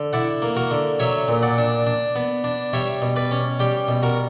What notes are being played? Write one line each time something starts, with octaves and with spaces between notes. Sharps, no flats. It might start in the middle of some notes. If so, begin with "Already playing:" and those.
Already playing: D3
E4 D5 F#5
A#3
F#4 A#4
D3
F#3 C#5 E5
A#2
D5 F#5
D4
D4
B3
D4
G3 C#5 E5
B2
B4 D5
C#4
G3 G4
B2
F#4 A#4